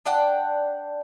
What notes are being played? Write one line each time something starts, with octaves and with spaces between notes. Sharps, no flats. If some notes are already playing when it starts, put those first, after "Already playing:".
D4 D5 F#5 G5